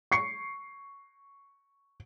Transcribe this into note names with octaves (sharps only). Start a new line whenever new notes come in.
C#6 C7 C#7